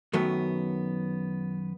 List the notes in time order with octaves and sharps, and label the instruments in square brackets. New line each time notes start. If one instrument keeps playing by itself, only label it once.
[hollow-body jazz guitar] F#2 D#3 F#3 A3 B3